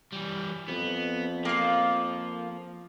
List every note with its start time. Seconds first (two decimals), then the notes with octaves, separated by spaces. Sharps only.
0.12 E3 G3
0.68 F2 B3
1.45 F3 A#3 F4